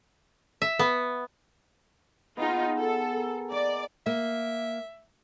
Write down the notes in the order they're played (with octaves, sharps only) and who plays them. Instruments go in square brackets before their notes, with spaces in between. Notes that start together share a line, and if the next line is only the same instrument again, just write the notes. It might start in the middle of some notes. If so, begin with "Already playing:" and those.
[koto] E5
B3
[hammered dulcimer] B3 G#4 [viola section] D#4 F4
[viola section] A4
[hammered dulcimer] A#4
[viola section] D5 [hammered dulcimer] D#5 A#5
[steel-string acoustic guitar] A#3 [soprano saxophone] E5